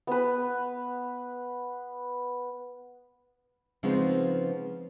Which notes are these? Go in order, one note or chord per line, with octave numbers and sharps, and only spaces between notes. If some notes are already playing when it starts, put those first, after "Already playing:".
B3 B4
C#3 F3 G#3 B3 C4 D#4